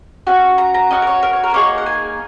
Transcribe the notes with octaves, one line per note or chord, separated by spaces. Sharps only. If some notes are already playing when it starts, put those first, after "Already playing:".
C#4 F#4
A#5
A#5
C#4 F#4 D#5
A#4
C#5
A#4
C#5
A#4
A#3 D#4 G#4 C#5
F#5
G#5